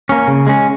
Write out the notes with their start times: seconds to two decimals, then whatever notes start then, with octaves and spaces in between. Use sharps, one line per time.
0.09 A#3 C#4
0.28 C#3
0.47 G#3 C#4